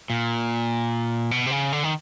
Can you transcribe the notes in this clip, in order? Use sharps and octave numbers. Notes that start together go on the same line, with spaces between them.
A#2
B2
C3
C#3
D3
D#3